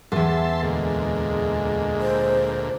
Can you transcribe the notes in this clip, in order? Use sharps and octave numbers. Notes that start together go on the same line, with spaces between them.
E2 G#2 E5 A5 C6
D2 A#2 G#3
C5